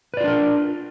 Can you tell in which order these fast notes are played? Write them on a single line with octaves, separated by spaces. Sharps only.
B4 D5 F4 D4 A#4